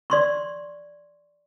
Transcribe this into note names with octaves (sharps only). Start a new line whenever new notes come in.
D5 C6 C#6